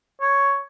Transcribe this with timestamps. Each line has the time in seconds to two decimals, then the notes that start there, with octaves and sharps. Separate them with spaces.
0.21 C#5